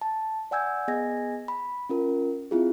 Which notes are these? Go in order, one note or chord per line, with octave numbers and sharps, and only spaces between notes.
A5
D5 F#5 G#5 E6 G6 G#6
B3 G#4 D#5 G#5 G#6 A#6
B5
C#4 F4 A#4
C4 E4 F4 G#4